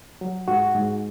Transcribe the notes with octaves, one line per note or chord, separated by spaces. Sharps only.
F#3
G#2 F#4
G#2